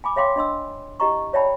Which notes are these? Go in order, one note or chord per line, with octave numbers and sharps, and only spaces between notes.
G#5 B5 D6
C#5 E5 F5 G5 C6 D6
D4 D#5 C6 E6
E4 G4 D#5 A#5 C#6
C#5 D5 E5 G5 A5 B5